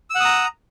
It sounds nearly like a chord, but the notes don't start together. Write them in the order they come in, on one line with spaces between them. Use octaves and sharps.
E6 F#5 D#6 A#5